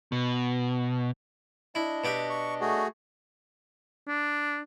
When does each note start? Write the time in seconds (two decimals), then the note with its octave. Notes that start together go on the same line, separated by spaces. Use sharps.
0.12 B2
1.75 D4 E4 D#5
2.04 B2 G4 E5
2.30 C#6
2.61 A3 F#4 G#4
4.07 D4